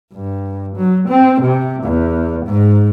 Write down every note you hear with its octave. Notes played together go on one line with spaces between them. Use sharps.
G2
F#3
C4
C3
E2
G#2